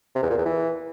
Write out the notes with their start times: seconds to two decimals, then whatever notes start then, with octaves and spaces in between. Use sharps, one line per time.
0.15 C3
0.23 E2
0.30 A#2
0.38 E2
0.46 E3